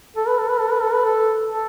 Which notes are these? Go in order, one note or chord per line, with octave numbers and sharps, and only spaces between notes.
A4
B4
A4
B4
A4
B4
A4
B4
A4
A4